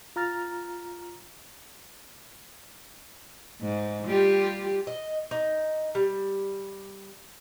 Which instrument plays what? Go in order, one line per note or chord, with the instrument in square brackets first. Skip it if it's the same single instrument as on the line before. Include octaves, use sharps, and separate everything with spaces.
[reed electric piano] F4 A#5 F6 A6
[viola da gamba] G#2
G3 F4 G4
[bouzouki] D#5
D#4
G3